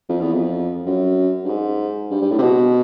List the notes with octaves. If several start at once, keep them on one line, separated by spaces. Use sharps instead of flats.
F2
E2
F2
F#2
G2
G#2
G2
G2
A2
C3
B2